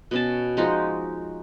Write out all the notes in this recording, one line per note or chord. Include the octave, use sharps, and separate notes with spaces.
B2 C#4 A5
F3 G#3 D#4 F#4